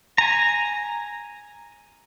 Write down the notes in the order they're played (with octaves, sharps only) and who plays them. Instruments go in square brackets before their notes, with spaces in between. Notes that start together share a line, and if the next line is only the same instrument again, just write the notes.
[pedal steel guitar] G#5 A#5